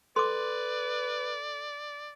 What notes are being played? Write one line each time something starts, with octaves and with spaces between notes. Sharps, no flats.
A4 B4 D5 C6 D6